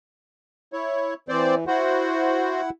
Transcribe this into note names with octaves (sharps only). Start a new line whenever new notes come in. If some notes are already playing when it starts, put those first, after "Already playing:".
E4 C#5
E3 C4 C5 D5
E4 F#4 C5 F#5